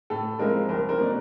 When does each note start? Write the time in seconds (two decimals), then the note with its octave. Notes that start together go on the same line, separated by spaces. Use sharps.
0.10 A2 A4
0.39 F3 G#3 C4 E4 A#4
0.69 C2 A#4 C5
0.89 A#4 C5
0.99 B2 F#3 A3 D5